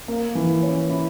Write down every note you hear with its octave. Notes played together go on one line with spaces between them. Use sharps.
A#3
E3
C#4
E4